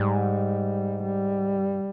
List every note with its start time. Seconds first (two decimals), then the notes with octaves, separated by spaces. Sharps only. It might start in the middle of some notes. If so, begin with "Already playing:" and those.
Already playing: G#2 G3
1.03 G3
1.57 G2